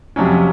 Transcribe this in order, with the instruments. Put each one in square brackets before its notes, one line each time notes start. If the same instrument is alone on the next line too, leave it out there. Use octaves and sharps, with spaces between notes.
[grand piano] F2 C3 F#3 C#4